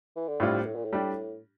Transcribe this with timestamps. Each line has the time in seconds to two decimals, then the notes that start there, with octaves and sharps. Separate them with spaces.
0.16 E3
0.28 D3
0.40 A2 C3 G3 D4 F4
0.66 A2
0.76 A#2
0.85 A2
0.93 G3 D4 G4